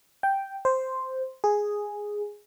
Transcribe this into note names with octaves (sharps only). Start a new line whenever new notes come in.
G5
C5
G#4